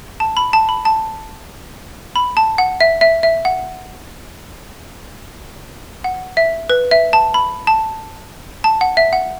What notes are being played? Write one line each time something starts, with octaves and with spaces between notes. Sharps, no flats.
A5
B5
A5
B5
A5
B5
A5
F#5
E5
E5
E5
F#5
F#5
E5
B4
E5
A5
B5
A5
A5
F#5
E5
F#5